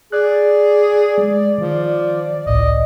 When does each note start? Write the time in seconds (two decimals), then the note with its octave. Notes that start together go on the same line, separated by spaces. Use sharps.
0.12 G#4 D5 F#6
1.18 G#3
1.58 D#3 F3
2.46 G#1 C#2 A2 D#5